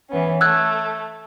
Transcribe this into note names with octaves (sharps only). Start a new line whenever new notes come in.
E3 B3 C#4
A3 E6 F#6 G#6